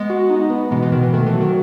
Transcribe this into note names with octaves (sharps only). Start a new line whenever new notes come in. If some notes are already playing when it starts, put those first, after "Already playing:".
Already playing: G#3 B3
F#4
D#4
B3
B2 E3 G#3
E3 G#3
B2 D#3
E3
D#3 A3
E3
F#3
D#3